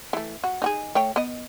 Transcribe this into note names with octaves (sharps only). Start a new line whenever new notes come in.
E3 A3
F#4
D#4 F#4 G#4
A3 C#5 G5
B3 D#5